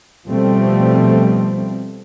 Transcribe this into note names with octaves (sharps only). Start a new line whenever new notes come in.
B2 F3 G3 A3 C4